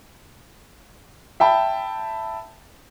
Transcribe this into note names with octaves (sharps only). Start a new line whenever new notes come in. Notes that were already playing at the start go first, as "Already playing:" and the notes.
E5 G5 A5 B5